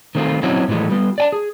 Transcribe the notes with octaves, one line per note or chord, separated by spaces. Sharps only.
D#3 A3 C4 E4 F4
F#3 C4 C#4 D#4 E4 F#4
A2 E3 F3 G#3 A3
G3 B3 F4
D5 G#5 A5
G#4